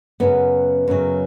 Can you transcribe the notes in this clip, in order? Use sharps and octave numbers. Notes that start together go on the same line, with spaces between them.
F#2 C#3 F#3 B3
F#2 C#3 F#3